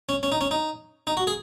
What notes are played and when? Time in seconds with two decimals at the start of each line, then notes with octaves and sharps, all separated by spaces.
0.09 C#4
0.23 C#4
0.32 D#4
0.41 C#4
0.51 D#4
1.07 D#4
1.17 F#4
1.27 G#4